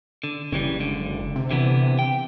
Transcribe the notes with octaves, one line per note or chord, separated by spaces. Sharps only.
D3
F#1 C#3 E3 G3
C#2 D3
C3
D3 E3 B3
G5